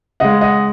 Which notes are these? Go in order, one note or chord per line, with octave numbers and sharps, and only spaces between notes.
C#3 G#3 D#5 F#5
D#5 F#5